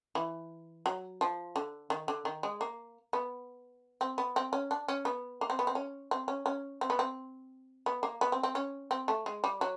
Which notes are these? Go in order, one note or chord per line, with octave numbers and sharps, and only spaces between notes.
E3
F#3
F3
D3
D#3
D3
D#3
G#3
A#3
B3
C4
B3
C4
C#4
D4
C#4
B3
A#3
C4
B3
C4
C#4
C4
C#4
C#4
C4
B3
C4
B3
A#3
B3
C4
C4
C#4
C4
A3
G#3
G3
F#3